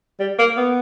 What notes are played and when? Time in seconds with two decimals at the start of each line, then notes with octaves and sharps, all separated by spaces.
0.20 G3
0.39 A#3
0.57 B3